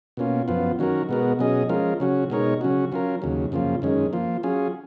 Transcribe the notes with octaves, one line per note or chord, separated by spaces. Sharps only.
B2 A#3 C#4 F4
F#2 F3 B3 F4
D#3 F#3 C#4 F#4 A#4
B2 G#3 B3 F#4 A#4
B2 F#3 C#4 G#4 D#5
F3 G#3 C#4 F4 A#4
C#3 F#3 C#4 F#4
B2 G#3 D#4 A#4 C#5
C#3 F#3 C#4 F#4
F#3 C#4 F4 A#4
D#2 C#3 F#3
F#2 C#3 F3 A#3 F4
F#2 D#3 G#3 C#4
F3 A#3 F4
F#3 C#4 F4 G#4